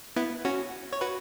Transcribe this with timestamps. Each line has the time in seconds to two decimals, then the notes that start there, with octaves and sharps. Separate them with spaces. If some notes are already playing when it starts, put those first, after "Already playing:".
0.16 B3 E4
0.45 C#4 F#4
0.93 C#5
1.01 F#4 B4